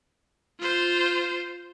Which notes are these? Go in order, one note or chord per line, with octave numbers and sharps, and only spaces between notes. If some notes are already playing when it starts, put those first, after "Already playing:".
F4 C5